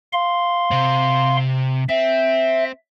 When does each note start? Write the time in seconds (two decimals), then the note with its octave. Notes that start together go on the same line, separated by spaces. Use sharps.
0.13 F5 C6
0.71 C3 C4
1.89 C4 E5